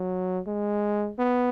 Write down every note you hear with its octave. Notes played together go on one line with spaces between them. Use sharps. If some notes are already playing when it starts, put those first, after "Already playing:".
Already playing: F#3
G#3
B3